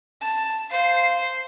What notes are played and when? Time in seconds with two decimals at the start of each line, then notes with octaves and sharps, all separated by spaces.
0.22 A5
0.71 C5 F5